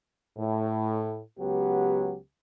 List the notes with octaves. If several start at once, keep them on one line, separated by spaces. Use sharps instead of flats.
A2
C#2 F#3 B3 G4